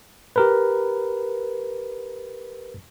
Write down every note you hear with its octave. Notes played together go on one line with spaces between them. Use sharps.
G4 A#4 B4